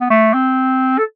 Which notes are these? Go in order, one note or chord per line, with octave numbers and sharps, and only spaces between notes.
B3
A3
C4
A4